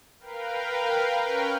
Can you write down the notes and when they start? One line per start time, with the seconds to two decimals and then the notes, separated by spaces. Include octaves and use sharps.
0.20 A#4 B4 F5 G5
1.23 C#4 A#4 B4 G5 C#6 F6